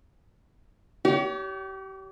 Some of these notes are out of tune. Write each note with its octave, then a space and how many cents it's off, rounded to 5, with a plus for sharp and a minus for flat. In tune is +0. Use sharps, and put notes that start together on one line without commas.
G4 -30 C#5 +35